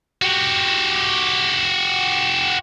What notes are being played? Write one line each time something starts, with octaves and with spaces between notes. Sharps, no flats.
F#4 G4